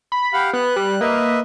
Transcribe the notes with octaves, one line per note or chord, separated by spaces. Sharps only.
B5
G4 F5 F#5
B3 F#6
G3
A#3 B4 D#5 E5